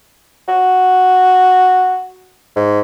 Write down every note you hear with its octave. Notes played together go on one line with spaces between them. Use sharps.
F#4
G#2